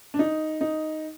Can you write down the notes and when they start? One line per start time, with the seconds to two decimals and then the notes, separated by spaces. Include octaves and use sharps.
0.14 D4
0.19 D#4
0.61 D#4